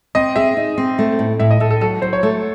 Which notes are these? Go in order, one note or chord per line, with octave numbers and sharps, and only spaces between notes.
C4 D#5
G#4 E5
D#4
C4
A3
A2
A2 E5
D#5
A2 A4
A4
F#3 A4
F#3 C5
C#5
A3 A4